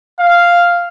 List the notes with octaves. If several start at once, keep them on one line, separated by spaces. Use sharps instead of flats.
F5